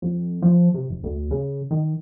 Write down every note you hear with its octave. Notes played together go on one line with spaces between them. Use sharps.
F2
F3
C3
F1
D2
C#3
D#3